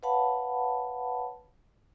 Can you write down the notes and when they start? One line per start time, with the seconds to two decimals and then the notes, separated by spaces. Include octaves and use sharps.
0.03 B4 C#5 F5 F#5 A5 B5